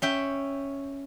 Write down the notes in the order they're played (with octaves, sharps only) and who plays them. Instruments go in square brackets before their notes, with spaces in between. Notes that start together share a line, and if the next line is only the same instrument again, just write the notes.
[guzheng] C#4 E5 G5